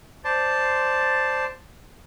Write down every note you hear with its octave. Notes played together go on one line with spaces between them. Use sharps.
C5 D5 A5 C6